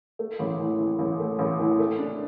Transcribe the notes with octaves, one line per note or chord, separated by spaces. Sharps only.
A3
A1
E3
E3
A1
A3
A1
E3
A3
D4